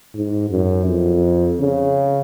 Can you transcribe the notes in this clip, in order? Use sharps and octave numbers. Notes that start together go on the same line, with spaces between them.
G#2
F#2
F2
C#3